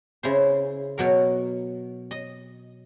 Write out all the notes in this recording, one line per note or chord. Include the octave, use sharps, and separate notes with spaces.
C#3 E4 C5
B2 F#3 A#4
D#5